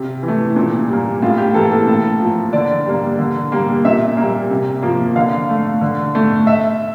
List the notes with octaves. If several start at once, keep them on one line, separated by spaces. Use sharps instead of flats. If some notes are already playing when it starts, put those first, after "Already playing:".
Already playing: C3
E3
A3
A#2
G3 A#3
A2 F4
G4
E3 A#3 A4
A4
A2 A4
F3
A#3
D3 D5
G3 A#3
D3
G3 A#3
A#2 E5
A#3
G3
C3
F3 A#3
D3 F5
A3
D3
A3
E5